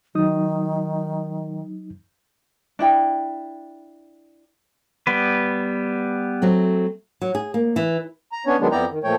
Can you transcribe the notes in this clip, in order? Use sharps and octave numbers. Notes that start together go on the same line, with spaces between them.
D#3 F#3 D#4 D#6
D4 E4 G5
G3 B3 B4
F#3 A3 C4
F#3
G#4
A#3
E3
A#5
B3 C#4 D4 C#5
D#3 F#3 G#3 B3 D4
F2 B3 E4 D5 G5 A#5
D#3
A#2 F3 A3 C#5 G5